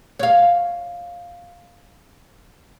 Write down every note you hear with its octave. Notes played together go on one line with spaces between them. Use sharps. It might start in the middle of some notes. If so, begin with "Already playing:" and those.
C#5 F5